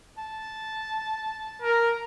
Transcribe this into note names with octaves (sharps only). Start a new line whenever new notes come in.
A5
A#4